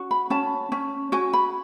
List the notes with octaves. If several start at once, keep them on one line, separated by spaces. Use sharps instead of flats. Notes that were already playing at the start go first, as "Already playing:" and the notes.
Already playing: C#4 F#4
B5
C#4 A5
C#4
F#4 G#5
B5